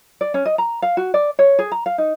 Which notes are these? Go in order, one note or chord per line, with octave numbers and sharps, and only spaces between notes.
D5
C#4
D#5
A#5
F5
F#4
D5
C#5
G#4
A#5
F5
D#4